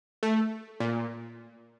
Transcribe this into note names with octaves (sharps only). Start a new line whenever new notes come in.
A3
A#2